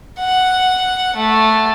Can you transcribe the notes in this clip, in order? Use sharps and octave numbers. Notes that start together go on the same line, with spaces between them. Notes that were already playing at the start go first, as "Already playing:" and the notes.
F#5
A3